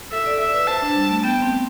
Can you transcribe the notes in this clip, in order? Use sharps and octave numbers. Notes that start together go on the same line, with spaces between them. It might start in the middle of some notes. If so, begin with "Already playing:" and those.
A4 E5
D5
E5
B4
C5 A5
D4
G3
A3
B3 G5
C4